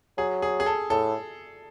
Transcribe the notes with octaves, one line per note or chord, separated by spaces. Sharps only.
F#3 G#4
G#4
G#4
A4
A2 A4